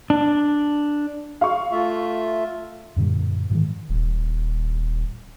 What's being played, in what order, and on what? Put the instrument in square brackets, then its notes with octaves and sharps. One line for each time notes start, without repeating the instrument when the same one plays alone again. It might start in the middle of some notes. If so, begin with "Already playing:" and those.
[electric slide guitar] D4
[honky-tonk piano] F5 C#6
[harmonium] A3 F4 E5
[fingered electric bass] F#2 A#2 D3 G3
G#2 D#3 E3 G#3
[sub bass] D#1